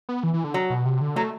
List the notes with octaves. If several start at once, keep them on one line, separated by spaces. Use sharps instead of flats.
B3
E3
E3
D3
F#3
B2
C3
D3
F#3 A3